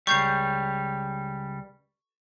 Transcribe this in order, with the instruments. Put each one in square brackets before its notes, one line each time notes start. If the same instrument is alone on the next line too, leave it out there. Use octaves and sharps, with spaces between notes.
[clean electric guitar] C#2 G3 [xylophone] C#6 G6 C7